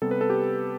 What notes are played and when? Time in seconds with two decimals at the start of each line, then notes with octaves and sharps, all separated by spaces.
0.02 C3 G3 B3 A4
0.11 B4
0.21 A4
0.30 G4